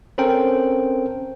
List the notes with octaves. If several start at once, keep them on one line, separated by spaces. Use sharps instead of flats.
C4 C#4 A4 A#4 C5 G5